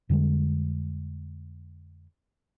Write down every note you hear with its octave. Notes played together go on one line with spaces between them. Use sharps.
F2 D3 G3 G#3